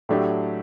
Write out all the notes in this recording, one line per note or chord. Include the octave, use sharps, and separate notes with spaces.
A2 F#3 A3 D4 G4